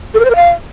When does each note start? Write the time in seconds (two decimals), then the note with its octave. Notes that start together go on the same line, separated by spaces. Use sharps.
0.14 A4
0.20 A#4
0.25 C5
0.30 A#4
0.36 F5